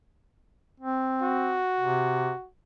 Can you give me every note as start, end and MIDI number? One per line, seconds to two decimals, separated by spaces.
0.80 1.60 60
1.22 2.48 66
1.79 2.32 48